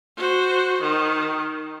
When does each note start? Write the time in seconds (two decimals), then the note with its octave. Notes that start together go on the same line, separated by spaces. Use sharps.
0.17 F#4 C5
0.82 D#3